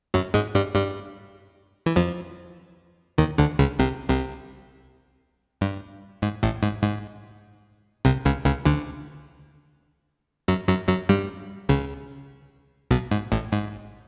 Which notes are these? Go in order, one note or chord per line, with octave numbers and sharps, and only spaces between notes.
F#2 F#3
G#2 G#3
G2 G3
G2 G3
E3
F2 F3
D#2 D#3
D2 D3
C#2 C#3
C2 C3
C2 C3
G2
G#2
A1 A2
G#2
G#2
C2 C3
C#2 C#3
C#2 C#3
D2 D3
F#2 F#3
F#2 F#3
F#2 F#3
G2 G3
C#2 C#3
B1 B2
G#2
A1 A2
G#2